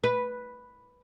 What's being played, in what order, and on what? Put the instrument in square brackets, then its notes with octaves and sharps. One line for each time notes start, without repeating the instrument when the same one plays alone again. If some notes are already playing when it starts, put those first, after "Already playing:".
[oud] B4